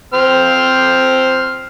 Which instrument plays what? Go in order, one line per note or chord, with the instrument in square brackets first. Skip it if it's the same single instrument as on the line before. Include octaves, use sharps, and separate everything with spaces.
[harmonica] C4 C5 F6